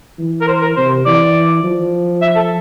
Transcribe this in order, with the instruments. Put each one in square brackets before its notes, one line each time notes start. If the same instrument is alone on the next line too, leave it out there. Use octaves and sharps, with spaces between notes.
[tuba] E3
[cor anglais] A#4
C5
A#4
[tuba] C3 [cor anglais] C5
[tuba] E3 [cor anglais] D5
[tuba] F3
[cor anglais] E5
A4